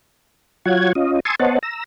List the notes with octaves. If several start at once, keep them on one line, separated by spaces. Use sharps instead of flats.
F#3 F4 C#5 F#5 G#6
C#4 F4 D#5
G#5 A5 C6 C#6 D#6 E6
B3 C5 C#5 D#5 F#5 A5
A#5 E6